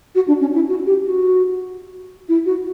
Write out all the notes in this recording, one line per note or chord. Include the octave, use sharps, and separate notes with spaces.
F#4
D4
C#4
E4
F#4
G4
F#4
E4
F#4